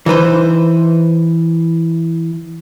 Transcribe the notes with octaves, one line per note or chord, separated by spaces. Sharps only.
E3 D#4 B4 C5